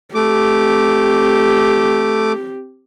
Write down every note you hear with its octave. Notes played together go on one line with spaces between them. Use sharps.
A3 C4 G4 D6